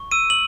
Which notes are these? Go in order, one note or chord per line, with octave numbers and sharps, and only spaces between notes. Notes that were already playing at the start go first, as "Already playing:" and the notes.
Already playing: C#6
E6 D#7
F#7